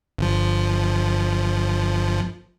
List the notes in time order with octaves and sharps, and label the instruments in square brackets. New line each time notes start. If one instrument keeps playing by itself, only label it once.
[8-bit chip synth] G1 F3